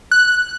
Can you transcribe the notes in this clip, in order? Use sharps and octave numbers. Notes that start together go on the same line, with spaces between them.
F#6